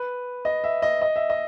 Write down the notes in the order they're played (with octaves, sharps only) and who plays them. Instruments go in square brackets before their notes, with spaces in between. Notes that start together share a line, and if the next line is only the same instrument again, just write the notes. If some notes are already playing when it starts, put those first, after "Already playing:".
Already playing: [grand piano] B4
D#5
E5
D#5
D#5
E5
D#5